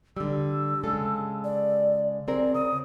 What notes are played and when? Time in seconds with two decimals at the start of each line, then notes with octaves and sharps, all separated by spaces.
0.17 D3 G3 E6
0.83 C#3 G#3 A4
1.44 D5
2.28 C4 G#4 A#4 D5
2.54 C#3 D#6